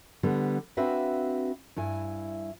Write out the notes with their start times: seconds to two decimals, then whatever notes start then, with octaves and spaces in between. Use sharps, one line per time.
0.23 D3 G3 B3
0.77 C4 D4 F#4 B4 E5 F5
1.76 G2 E4 G#5